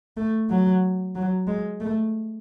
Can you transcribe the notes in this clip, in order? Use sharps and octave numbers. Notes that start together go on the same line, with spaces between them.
A3
F#3
F#3
G#3
A3